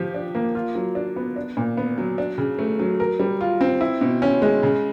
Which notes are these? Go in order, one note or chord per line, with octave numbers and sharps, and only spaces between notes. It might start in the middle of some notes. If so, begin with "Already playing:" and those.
Already playing: F3 G4
D4
A#3
F4
F#3
D4
B3
D4
A#2
B3
F#3
D4
C#3
A3
F#3
A#4
G3
F4
C4
E4
B2
C#4
G#3
C#3